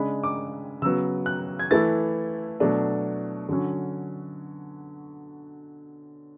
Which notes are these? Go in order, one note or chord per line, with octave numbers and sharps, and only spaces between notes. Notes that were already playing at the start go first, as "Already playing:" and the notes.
Already playing: C#3 G#3 D4 B5
D6
C#3 F#3 B3 E6
F#6
G#6
E3 A3 E4 A6
B2 F#3 A3 D4
D3 F#3 C#4